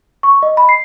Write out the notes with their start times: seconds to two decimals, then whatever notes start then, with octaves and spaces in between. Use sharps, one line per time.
0.23 C#6
0.43 D#5
0.57 B5
0.69 C7